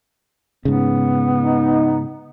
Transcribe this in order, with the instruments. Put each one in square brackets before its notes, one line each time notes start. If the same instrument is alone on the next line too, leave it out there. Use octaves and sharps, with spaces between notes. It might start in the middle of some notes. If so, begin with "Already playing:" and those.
[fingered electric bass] G#2 C#3 [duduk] B3
[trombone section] D#4